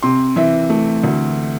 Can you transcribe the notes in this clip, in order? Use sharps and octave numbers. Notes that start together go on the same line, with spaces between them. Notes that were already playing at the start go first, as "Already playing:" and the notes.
C3 C6
E3 E5
A3
D2